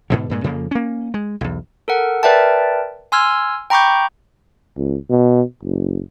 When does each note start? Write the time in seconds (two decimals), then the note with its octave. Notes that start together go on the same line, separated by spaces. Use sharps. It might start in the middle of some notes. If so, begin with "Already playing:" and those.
0.10 G#2 B2 D3
0.30 G2 A#2 G#3
0.44 F2 C#3 F3 A#3
0.71 A#3 C#4
1.14 G#3
1.41 B1 E2
1.88 A4 A#4 F#5
2.23 A#4 B4 D5 E5 G5 A5
3.12 G#5 C6 E6 F6 G#6
3.70 G5 A#5 B5 C#6 D6 G6
4.76 C#2
5.10 B2
5.63 F#1